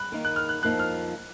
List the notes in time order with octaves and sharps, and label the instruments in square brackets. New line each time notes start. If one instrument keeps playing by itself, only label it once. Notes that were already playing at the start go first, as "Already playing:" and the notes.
Already playing: [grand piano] B5 F#6
[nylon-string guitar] D#3 A#3 D#4
[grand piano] F#6
F6
F#6
[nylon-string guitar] F2 F3 A#3 D#4 [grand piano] F#6
[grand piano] F6